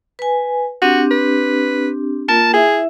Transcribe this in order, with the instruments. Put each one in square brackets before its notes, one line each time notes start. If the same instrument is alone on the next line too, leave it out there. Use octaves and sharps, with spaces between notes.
[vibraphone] B4 G#5
[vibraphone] C4 D4 G4 [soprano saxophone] F#4
[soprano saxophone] B4
[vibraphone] A#3 F4 A#4 [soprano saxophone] A5
[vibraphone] E4 E5 [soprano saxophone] G#4